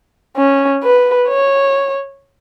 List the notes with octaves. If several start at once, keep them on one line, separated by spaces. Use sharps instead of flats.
C#4
B4
C#5